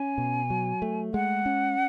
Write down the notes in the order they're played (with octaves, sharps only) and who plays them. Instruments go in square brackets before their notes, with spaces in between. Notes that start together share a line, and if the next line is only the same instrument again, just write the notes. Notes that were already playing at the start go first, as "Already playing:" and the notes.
Already playing: [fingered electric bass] C#4 [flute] G#5
[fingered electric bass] B2
F#3
A3
[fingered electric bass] G#3 [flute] F#5
[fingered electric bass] C#4